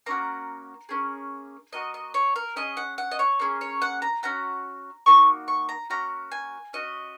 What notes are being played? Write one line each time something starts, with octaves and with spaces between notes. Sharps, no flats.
A#3 C#4 F#4 A#5
A#3 C#4 G#4
A#3 F#4 D#5
D#5
C#5
A#4
C#4 G#4 D#5
F#5
F#5
D#5
C#5
A#3 C#4 G#4
C#5
F#5
A#5
C#4 F#4 A#5
A#3 D#4 F#4 C#6
C#6
A#5
A#3 C#4 F#4 A#5
G#5
C#4 F#4 D#5